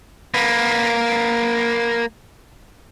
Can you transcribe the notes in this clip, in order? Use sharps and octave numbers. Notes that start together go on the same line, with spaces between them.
A#3 B4